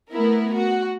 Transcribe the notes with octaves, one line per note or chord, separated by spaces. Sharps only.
A3 B3 E4 A#4
F#4